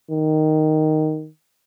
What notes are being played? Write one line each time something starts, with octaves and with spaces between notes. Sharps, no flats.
D#3